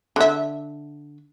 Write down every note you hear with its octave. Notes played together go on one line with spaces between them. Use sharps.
D3 E5